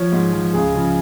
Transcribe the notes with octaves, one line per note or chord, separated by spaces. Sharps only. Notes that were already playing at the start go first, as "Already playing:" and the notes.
Already playing: F3 C#5
G#2
F3
C#2 G#4
C#3 F3